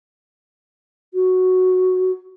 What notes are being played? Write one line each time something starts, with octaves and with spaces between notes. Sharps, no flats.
F#4